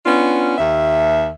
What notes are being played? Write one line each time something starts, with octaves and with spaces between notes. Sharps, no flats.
B3 C#4 D4 F4
D#2 E5